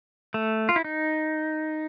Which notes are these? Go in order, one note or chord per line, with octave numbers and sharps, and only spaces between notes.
A3
F4
E4
D#4